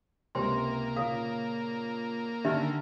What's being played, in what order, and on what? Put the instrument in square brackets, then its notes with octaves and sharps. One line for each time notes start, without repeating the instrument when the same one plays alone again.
[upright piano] C#2 C3 [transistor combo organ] A#3 [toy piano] C5 G5 C6
[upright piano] A#2 C#3 [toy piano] F5 D#6
[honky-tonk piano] D3 [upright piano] D#3 G#5 F6 [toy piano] D#4 G4 E5